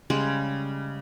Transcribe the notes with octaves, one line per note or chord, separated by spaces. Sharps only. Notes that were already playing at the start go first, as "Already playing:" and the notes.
C#3 G3 G#3